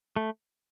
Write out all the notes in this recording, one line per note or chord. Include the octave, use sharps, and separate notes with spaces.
A3